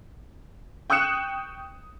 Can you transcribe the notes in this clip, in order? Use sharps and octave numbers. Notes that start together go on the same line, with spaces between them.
G5 C#6 D#6 F#6 C#7 E7